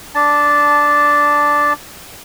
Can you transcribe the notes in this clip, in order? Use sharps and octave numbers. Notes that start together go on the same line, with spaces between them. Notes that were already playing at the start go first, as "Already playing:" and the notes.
D4 A5